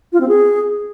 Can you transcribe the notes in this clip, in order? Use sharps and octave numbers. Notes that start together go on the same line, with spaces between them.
F4
C4
G#4